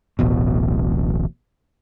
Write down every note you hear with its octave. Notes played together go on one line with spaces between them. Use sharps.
D1 A1 B2